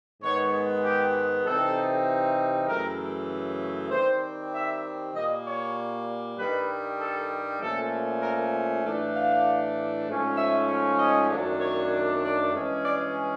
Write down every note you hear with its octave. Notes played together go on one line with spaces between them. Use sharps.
G#2 D#3 G#3 B3 C#5
G4
C3 E3 G3 C4 D#4 A4
F#2 C#3 E3 A3 A#4
D#3 G3 C4 C5
E5
A#2 G3 A#3 D#5
C#5
G2 D#3 G3 B4
A4
A#2 F3 A3 C#4 A4
A#4
A2 E3 A3 D4
F5
G#2 F3 A3 C#4
E5
D#5
F#2 D#3 F#3 A3 D4
C#5
D5
G2 E3 G#3 C#4
D5